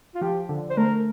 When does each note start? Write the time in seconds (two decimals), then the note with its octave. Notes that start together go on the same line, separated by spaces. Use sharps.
0.15 F4
0.21 F3 G4
0.49 D3
0.70 C5
0.77 A3 A#4